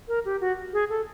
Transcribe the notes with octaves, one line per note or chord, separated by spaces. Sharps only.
A#4
G4
F#4
G#4
A4